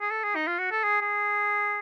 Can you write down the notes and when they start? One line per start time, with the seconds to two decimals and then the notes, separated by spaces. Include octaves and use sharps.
0.01 G#4
0.11 A4
0.24 G#4
0.36 D#4
0.47 F4
0.59 F#4
0.71 A4
0.84 G#4
1.01 G#4